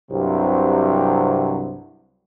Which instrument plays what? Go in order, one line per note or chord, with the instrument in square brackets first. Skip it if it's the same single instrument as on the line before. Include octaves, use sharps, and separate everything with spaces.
[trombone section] C2 G2 C3 F#3